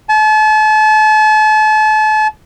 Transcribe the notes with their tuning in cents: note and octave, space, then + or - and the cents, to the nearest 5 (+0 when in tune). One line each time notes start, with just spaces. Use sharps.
A5 -35